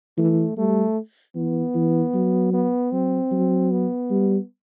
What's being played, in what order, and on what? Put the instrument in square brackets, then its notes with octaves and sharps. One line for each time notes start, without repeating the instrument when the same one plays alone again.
[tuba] E3 [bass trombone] A3
[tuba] G3 [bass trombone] A3
[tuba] E3 [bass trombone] B3
[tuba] E3
F#3
[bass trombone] B3
[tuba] F#3 [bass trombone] C4
[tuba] F#3
[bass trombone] B3
[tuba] G3